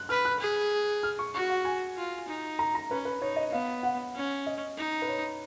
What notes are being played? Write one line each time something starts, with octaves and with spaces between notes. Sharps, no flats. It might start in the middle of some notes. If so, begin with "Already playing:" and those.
Already playing: F#6
B4 F6
F#6
G#4
F6
C#6
F#4 C#6
F#5
G#5
F4
D#4
A#5
A#5
C#4 B4
B4
D#4 C#5
D#5
B3 F5
F#5
C#4
D#5
D#4
B4
C#5